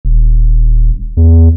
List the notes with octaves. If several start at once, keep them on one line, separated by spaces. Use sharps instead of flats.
D#1
E2